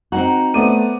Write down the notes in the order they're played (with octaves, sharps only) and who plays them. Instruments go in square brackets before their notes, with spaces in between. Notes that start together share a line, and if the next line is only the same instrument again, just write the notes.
[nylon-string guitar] C4 D#4 F#4 [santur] F#5 A#5
[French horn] A3 [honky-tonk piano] B3 D#7 [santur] C5 D5